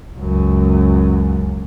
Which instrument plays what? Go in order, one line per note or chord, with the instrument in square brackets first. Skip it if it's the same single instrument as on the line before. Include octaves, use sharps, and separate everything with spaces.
[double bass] C#2 F#2